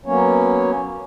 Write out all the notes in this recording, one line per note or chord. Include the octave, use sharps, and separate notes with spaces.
F#3 A#3 B3 C#4 C#5